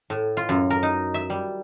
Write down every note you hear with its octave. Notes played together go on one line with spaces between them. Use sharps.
A2
F4
F#2
A#4
D#4
E5
G3